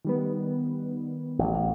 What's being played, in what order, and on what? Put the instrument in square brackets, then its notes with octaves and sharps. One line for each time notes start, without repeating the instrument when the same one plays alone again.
[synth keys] D#3 G3 B3
[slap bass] A1
A1